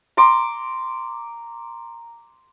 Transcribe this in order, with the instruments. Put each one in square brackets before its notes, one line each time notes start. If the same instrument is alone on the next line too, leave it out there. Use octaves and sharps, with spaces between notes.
[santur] A#5 C6 D6